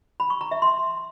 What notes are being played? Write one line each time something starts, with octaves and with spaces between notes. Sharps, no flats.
B5
C#6
A#5
E5
C6